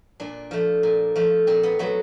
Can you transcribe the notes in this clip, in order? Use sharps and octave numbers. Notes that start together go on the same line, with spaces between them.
A#2 D4
F3 A3
A#2
F3 A3
A#2 C4
B3
F#3 A3 B3